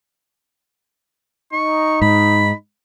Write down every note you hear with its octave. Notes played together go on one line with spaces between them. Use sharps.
D#4 C#6
G#2 B5